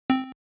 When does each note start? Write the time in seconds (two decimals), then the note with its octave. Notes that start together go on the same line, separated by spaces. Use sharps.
0.10 C4